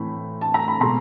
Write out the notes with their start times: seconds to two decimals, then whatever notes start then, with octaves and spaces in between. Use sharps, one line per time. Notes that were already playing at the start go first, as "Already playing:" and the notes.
Already playing: A2 E3 A3 C4 B5
0.41 A5
0.54 A#5
0.68 B5
0.80 B2 G#3 A#5 C6